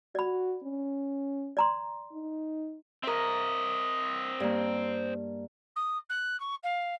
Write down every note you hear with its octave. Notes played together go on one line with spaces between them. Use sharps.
F#4 D5 B5
C#4
D5 A#5 C6
D#4
C4 A#4 D#5 E5
G2 A#3
D#6
F#6
C#6
F5